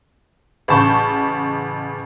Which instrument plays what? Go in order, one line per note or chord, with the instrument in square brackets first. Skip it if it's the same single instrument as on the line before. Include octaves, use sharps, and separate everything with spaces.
[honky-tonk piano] A1 C#3 A5 C#6 G6